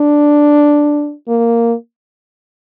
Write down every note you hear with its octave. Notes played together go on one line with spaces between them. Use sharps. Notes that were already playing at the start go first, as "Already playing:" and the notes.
Already playing: D4
A#3